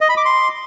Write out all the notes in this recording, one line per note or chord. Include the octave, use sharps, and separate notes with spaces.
D#5
B5
D6
C6